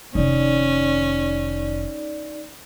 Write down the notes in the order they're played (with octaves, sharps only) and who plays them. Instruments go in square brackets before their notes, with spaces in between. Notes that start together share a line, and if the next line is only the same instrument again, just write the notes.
[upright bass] F1 D#3 [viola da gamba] C#4 [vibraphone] D#4 D5